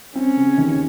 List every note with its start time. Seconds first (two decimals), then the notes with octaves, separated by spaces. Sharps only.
0.15 C4 C#4
0.37 C#3
0.58 D#2